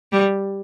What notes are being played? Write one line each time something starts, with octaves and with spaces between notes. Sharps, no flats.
G3